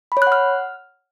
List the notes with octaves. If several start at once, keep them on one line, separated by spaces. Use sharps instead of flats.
B5
C#5
F#6
F#5
F6